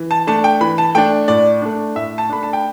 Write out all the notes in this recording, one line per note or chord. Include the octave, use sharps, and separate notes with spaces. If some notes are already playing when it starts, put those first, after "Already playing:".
Already playing: E3
A5
A3 D4 A5
G5
E3 B5
A5
A3 D4 G5
A2 D5
A3 D4
A2 E5
A5
A3 D4 B5
A5
G5